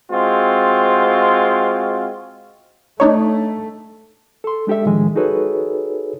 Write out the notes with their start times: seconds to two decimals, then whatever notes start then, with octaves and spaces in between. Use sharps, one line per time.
0.12 G#3 C4 F4 F#4
3.00 A3 D4 D#4 C#5
4.44 A4 C6
4.67 G#3 D4 G4 A4 E5
4.85 A2 D#3 F3 G#3
5.15 D#4 F#4 G#4 A4 B4 C#5